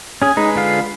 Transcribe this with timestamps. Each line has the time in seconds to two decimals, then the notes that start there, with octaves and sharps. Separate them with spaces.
0.22 C#4 G#4 G#5
0.37 G#3 D#4 B4
0.56 D3 F4 F5